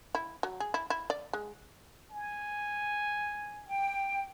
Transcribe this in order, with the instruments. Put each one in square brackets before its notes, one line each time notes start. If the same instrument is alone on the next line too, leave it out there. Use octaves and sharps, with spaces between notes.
[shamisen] E4
F#3
G#4
E4
E4
D5
G#3
[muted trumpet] G#5
[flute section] G5